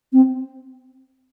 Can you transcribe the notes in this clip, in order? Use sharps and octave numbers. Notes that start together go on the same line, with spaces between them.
C4